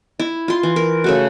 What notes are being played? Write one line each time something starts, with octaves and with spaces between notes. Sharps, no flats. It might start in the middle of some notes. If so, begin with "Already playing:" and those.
E4
F4 C6
E3
A#4
C#3 A3 F#4